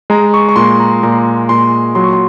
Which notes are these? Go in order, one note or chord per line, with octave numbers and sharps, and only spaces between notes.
G#3 A#5
C#6
C#6
A#2 C6
A#5
A#2 A#5
A#2 C6
F#3 C6
C#6
C6